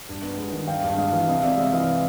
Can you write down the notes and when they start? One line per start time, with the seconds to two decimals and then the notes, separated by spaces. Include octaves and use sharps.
0.09 G2
0.23 B3
0.38 G#3
0.53 D#3
0.68 G2 F5 G5
0.84 G2
0.97 G#3 D#5 F5
1.13 E3
1.28 C3 D#5 F5
1.42 C3 D5 E5
1.57 G#3 D#5 F5
1.73 E3 D#5 F5